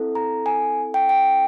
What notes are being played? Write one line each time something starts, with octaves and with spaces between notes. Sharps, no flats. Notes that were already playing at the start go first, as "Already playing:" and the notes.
Already playing: C4 E4 A4
A#5
G#5
G5
G5